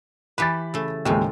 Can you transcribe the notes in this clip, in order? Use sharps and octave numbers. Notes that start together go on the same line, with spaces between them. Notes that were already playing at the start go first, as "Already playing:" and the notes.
E3 G4 B4 B5 A6
C#3 A3
D#2 A2 C#3 F3 G#3